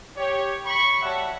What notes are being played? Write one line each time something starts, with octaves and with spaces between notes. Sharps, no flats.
G4 C#5
B5 C#6
G3 F#4 C#5 E5 F#5 A5